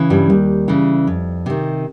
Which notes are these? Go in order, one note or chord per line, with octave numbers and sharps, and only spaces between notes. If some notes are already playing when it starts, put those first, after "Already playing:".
Already playing: C#3 E3
G2 G3
D#2
C#3 E3
F2
C3 D#3